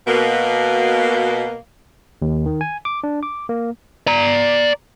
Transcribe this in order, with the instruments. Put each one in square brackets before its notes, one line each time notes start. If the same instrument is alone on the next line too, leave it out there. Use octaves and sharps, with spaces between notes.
[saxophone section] B2 A#3
[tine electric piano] D#2
D#3
G#5
D6
D4
D6
A#3
[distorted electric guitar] D5 A#5